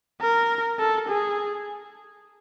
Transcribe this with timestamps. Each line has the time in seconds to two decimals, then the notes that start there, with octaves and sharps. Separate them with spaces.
0.21 A#4
0.79 A4
1.09 G#4